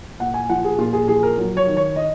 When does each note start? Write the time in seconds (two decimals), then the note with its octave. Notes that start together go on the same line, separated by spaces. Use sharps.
0.20 A#2 F#5
0.34 G#5
0.49 F3 F#5
0.64 G#4
0.79 A#2 F4
0.93 G#4
1.08 F3 G#4
1.23 A#4
1.38 F#3
1.57 C#5
1.66 D#3
1.77 C#5
1.96 D#5